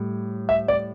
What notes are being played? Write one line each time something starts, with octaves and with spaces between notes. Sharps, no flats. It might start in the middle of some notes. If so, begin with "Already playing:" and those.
Already playing: A2 G3
E5
D5